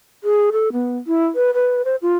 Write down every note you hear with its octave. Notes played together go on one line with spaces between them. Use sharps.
G#4
A4
B3
E4
B4
B4
C5
F4